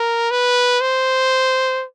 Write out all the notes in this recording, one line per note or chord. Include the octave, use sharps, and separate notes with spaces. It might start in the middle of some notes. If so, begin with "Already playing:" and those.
Already playing: A#4
B4
C5